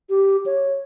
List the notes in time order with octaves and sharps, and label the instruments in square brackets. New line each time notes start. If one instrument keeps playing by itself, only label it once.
[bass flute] G4
C#5